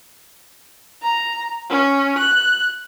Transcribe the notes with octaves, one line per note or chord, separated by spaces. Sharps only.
A#5
C#4
F#6